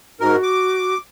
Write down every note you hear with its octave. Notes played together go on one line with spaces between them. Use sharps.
G#2 F#4 A#4
D6